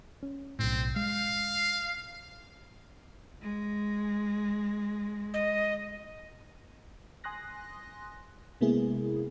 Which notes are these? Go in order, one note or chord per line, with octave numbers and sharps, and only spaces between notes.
C#4
B1 A2 C4
G#3 F5
G#3
D#5
G#5 C6 D#6 F#6 A#6
C3 G#3 A#3 B3 E4 G#4